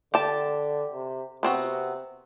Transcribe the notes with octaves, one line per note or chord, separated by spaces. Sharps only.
D3 G4 A5
C3
C3 B3 C4 F#4